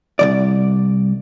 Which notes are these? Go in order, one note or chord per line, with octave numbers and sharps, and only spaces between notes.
C2 C3 D5